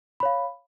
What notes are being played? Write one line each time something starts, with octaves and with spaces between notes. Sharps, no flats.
C#5 F5 B5